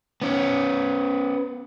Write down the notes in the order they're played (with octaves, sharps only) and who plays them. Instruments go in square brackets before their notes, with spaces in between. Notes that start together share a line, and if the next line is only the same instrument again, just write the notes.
[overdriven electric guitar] B3 C#4